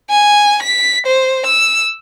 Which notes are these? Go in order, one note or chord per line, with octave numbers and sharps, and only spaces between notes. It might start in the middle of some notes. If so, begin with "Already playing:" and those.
G#5
B6
C5
E6